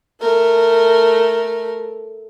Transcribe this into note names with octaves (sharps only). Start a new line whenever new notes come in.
A3 A#4